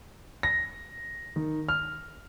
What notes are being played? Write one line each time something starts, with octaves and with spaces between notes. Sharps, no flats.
A#6
D#3
F6